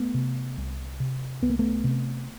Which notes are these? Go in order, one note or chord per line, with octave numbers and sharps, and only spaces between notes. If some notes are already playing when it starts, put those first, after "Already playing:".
Already playing: A3 B3
C3
C2
C3
C2 B3
A#3
A3 B3
C3